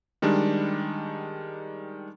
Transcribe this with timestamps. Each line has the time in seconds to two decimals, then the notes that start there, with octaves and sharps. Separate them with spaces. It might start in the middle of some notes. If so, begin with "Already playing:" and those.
0.22 D#3 G3 G#3 D4